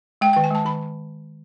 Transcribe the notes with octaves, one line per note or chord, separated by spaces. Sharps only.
G#3 G5
G5
D#3
G#5
G#3 A5
D#3 B5